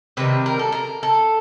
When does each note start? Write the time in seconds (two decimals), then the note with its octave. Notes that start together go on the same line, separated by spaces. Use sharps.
0.17 C3 D#3 G3 B4
0.46 A#4
0.59 A4
0.72 A#4
1.03 A4